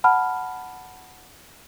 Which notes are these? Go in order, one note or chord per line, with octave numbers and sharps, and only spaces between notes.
F#5 A5 B5 F6